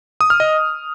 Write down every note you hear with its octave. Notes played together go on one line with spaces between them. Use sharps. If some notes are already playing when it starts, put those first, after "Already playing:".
D#6
F6
D#5